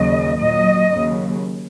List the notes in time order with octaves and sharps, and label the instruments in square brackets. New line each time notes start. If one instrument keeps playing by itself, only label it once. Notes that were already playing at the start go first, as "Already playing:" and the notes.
Already playing: [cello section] D#2 C#3 F#3 D#5
A#2 F#3 D#5
D#2 C#3 F#3